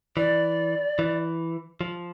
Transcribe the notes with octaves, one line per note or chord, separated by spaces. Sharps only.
E3 D5
E3
F3